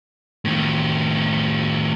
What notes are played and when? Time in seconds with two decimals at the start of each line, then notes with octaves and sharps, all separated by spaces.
0.45 A2 D#3